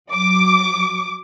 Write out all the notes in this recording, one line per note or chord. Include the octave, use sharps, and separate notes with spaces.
F#3 D6